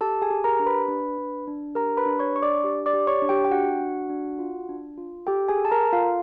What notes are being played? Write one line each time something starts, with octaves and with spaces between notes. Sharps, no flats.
G4 A4 A5
G#4 G#5
G4
A#4 A#5
D4
B4 B5
D4
D4
D4
G4 A#4 A#5
B4 B5
D4
C#5 C#6
D4 C#6
D5 D6
G4
D5 D6
G4
C#5 C#6
D4
G4 G5
G5
D4 F#4 F#5
D4
D4
F4
D4
F4
G4 A4 G5
G#4 G#5
A4
A5
A#4 A#5
A4
F4 F5